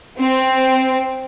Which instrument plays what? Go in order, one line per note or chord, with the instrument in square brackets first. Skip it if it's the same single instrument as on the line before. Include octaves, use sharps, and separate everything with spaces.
[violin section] C4